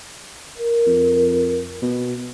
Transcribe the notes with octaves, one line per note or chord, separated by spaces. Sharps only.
A#4
F2
B2